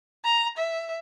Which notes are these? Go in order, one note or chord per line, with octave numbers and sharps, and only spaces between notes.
A#5
E5